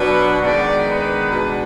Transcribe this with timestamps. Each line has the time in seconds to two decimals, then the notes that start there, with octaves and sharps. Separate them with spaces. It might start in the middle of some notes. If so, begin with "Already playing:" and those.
Already playing: B2 F#3 B3 D4 B4
0.42 D#3 G#3 B3 D4 D5
0.87 B4
1.31 B2 G#3 D4